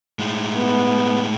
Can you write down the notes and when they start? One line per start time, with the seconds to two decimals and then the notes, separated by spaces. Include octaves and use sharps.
0.19 A2 G#3
0.56 B3